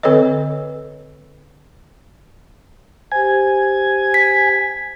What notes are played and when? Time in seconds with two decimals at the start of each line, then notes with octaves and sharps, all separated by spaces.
0.03 D3 C4 A4 B4 C#5 D#5
3.12 G4 C5 G#5
4.14 B6